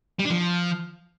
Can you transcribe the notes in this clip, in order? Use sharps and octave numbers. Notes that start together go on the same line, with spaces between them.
G3
D4
F3